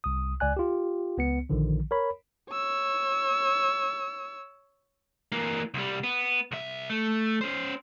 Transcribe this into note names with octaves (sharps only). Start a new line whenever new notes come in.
C2 D#6
C#2 D5 G#5 F#6
F4 G4
C#2 B3 C#7
A#1 D3 D#3 F3
A#4 C#5 B5
C#5 E6
E3 A#3
C2 G3
B3
C2 E5
A3
C#4 C5